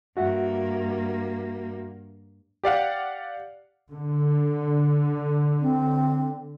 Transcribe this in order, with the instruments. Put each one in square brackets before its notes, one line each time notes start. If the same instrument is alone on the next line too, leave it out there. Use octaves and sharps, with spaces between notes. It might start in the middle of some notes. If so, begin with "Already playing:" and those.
[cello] G2 A#3 [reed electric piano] F#4 E5 F#5
[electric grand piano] G4 D5 F5 F#5
[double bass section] D3
[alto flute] C4